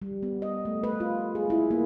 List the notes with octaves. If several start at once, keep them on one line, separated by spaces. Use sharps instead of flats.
G3
B3
D#5
A3
B4
F4
G#4
E4
A#3